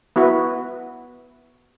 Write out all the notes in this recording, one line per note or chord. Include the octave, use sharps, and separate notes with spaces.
B3 E4 F#4 B4